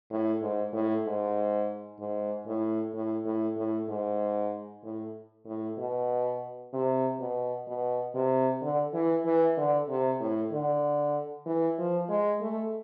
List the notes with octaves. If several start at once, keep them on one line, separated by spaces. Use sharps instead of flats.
A2
G#2
A2
G#2
G#2
A2
A2
A2
A2
G#2
A2
A2
B2
C3
B2
B2
C3
D3
E3
E3
D3
C3
A2
D3
E3
F3
G#3
A3